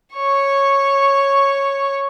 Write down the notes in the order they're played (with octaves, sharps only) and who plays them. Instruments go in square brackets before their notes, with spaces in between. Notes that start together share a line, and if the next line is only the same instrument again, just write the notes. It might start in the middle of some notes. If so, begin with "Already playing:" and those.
[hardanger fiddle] C#5 C#6